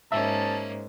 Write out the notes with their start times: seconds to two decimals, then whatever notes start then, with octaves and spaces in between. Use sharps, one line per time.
0.12 G#2 A#3 C#4 E5 A5